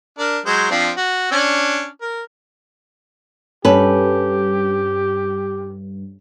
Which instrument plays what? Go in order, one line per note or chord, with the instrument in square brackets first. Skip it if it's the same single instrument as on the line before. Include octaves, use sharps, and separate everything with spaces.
[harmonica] D4 A#4
F#3 G#3 C5
F3 C4 D4
F#4
C#4 D4
A#4
[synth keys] G2 [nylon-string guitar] C#4 A4 B4 [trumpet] G4